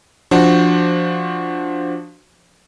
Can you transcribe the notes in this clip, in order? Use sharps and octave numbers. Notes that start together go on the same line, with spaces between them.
F3 D4 F#4 C5